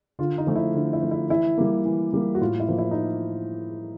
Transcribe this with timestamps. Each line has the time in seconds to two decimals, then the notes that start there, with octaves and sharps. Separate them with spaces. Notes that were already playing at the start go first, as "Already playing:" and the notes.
0.19 D3 F4
0.38 D#4
0.47 F3 A3
0.55 E4
0.74 D3
0.93 E4
1.02 F3 A3
1.11 E4
1.30 E3 E4
1.58 G3 A#3
1.85 E3
2.13 G3 A#3
2.35 F#4
2.41 A2 F4
2.60 E4
2.69 F3 A#3
2.78 E4
2.91 D#4